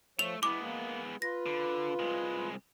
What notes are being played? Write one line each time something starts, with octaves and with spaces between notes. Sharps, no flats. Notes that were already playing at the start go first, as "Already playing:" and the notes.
F3 A3 C#5 F7
G#3 B3 E4 D6
A#3
F4 B4 A#6
D3
C2 G#3